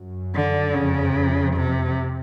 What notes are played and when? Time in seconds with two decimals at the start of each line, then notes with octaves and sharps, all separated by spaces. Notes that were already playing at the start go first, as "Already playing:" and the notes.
Already playing: F#2
0.35 D3
0.74 F2 C#3
1.15 F2
1.56 C3